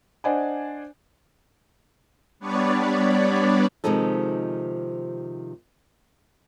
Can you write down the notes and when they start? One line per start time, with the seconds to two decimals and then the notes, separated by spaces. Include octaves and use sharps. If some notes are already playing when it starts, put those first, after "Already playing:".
0.24 D4 C5 D5 D#5 F#5 G#5
2.39 G3 B3 D4 B4 C#5 D5
3.84 C3 D#3 F3 G#3 D#4 A4